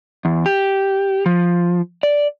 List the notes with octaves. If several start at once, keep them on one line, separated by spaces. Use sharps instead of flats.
E2
G4
F3
D5